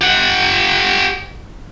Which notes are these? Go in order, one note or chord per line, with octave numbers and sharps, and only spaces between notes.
G4 F#5